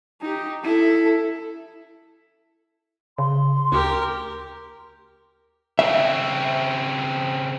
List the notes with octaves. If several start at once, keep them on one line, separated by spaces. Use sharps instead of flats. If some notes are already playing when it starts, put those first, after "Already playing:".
D#4 G4
E4 A4
C#3 C6
D2 G4 A#4
C#3 C4 E5